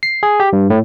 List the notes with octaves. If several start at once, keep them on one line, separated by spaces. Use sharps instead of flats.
C7
G#4
G4
G2
A2